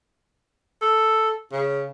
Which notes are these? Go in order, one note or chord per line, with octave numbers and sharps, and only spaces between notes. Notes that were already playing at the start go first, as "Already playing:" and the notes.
A4
C#3